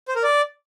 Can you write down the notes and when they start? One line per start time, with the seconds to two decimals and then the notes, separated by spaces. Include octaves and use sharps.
0.08 C5
0.16 A#4
0.23 D5